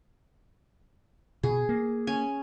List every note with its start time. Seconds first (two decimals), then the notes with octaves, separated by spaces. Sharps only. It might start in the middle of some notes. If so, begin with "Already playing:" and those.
1.43 B2 G#4
1.69 A#3
2.07 C#4 G#5